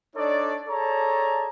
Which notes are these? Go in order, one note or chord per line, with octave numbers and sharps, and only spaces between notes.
D4 D#4 A4 C#5 D5
G#4 A4 C#5 D5 A5 A#5